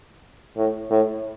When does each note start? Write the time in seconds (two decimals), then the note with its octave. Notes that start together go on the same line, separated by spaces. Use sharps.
0.57 A2
0.90 A2